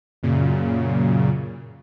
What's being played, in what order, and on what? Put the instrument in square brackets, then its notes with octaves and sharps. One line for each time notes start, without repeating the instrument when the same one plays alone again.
[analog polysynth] F#2 A#2 C#3